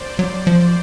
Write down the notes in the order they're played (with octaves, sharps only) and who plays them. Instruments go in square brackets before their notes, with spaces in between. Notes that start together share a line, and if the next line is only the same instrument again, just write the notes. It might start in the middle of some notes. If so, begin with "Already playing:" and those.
Already playing: [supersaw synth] C5 D5
[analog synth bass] F#3
F3